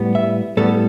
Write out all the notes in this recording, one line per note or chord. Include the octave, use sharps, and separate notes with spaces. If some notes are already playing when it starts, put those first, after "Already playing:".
Already playing: A2 G3 B3
E5
A2 G3 B3 A4